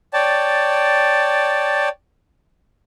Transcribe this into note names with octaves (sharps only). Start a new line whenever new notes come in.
C#5 D5 G5 A5